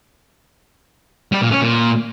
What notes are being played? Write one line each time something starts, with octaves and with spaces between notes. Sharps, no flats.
G3
A#2
C#4
A#2